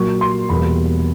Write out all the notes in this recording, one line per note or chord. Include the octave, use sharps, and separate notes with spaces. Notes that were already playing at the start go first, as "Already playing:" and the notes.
Already playing: A#2 F#3 A#3 C#6
C6
E2 B2 G3 A#3 B5